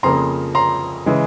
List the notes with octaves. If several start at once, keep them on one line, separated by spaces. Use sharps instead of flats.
F2 C#3 F3 A#3 A#5 C6
A#5 C6
C#3 E3 G#3